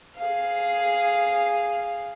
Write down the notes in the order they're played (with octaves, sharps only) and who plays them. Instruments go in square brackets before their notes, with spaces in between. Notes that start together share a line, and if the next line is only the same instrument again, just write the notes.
[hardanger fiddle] G#4 F5